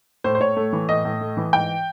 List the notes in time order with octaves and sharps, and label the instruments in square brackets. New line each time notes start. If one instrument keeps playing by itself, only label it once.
[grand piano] A2 C5
C5
A2 C#5
A3
E3
A2 D#5
A2
A3
E3
G#2 G5